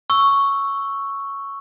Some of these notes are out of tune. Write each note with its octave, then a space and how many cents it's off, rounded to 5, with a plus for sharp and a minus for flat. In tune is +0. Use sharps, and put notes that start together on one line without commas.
C#6 +0 E6 +0